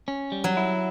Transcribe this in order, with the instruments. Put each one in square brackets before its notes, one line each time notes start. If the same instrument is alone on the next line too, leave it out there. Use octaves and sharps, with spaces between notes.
[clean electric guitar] C#4
G3
[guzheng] F#3
[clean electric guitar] E4